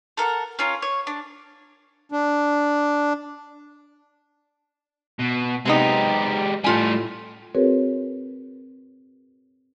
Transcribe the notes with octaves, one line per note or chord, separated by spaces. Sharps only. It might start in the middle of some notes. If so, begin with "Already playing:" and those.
A4 A#4 F5 F#5
C#4 F4 A#4
C#5
D4
D4
B2
C3 G#3 B3 D#4 G4
A2 G3 A3 F4 G#5
C4 F#4 G#4 A#4 B4 C#5